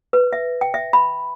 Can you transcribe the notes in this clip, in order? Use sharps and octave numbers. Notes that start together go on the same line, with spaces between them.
B4
E5
G5
E5
B5